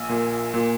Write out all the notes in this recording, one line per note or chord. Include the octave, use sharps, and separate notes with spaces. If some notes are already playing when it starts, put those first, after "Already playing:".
Already playing: A#1 G#5
A#2
A#2